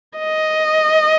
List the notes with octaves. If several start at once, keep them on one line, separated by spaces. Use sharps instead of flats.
D#5